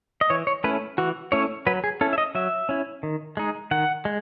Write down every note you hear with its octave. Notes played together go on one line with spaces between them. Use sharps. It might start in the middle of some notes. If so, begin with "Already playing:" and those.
D#5
E3 C#5
C#5
A3 C#4 E4 B4
E3 F#4
A3 C#4 E4 C#5
F#3 B4
G#4
C#4 E4 A4
E5
D#5
F#3 E5
C#4 E4
D#3
G#3 D#4
D#3 F#5
G#3